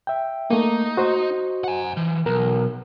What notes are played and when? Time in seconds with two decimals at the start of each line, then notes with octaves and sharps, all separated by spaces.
0.07 E5 G5
0.50 A3 A#3 D#4
0.97 F#4 C5 D#5
1.64 F#5 G#5
1.97 E3
2.26 B1 A#4